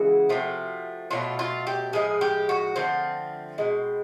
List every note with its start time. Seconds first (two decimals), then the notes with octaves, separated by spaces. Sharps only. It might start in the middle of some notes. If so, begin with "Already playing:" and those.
Already playing: C#3 E3 G#3 F#4
0.29 C3 F3 A3
1.11 B2 F#3 A3 F4
1.39 F4
1.67 G4
1.93 A2 F3 G#3 G#4
2.21 G4
2.49 F#4
2.76 D3 F3 A3 C4
3.58 B2 G#3